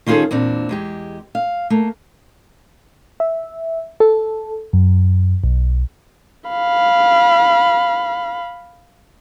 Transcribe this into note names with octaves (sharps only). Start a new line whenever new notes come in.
D#3 C#4 F4 F#4 G#4 A4
E2 A#2 C4 D4
E2 G#3 G4
F5
A3 A#3
E5
A4
F#2
B1
F5 B5